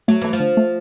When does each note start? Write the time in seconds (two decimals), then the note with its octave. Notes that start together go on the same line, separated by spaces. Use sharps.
0.08 F#3 A3
0.22 E3 A3
0.33 F3
0.40 D3
0.57 A3